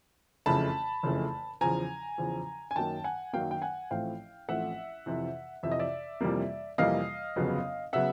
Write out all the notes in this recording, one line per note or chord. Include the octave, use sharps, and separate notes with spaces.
F#1 F2 C#3 E3 A3 A5 B5
F#1 F2 C#3 E3 A3
E2 C#3 F3 G#5 A#5
E2 C#3 F3
G#5
F#2 D#3 F#3 A#3 G5 A5
F#5 G#5
F#2 D#3 F#3 A#3 F5 G5
G5
F#5 G#5
A1 A2 F3 A3 C4 F5 G5
A1 A2 F3 A3 C4 E5 F#5
F2 C3 E3
F2 C3 E3 E5
D#5
D5 E5
F2 C3 E3 G3 A#3
F2 C3 E3 G3 A#3 D#5 F5
G1 F2 C#3 F#3 B3
C#3 F#3 B3 E5 F#5